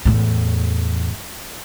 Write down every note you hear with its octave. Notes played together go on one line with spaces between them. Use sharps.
E2 A2